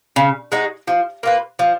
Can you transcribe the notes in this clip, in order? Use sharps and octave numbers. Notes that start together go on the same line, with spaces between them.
C#3
G#3 D#4 F#4
F3
A#3 F4 B4
F3